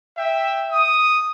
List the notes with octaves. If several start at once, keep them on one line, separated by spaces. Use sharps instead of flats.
E5 G5
D#6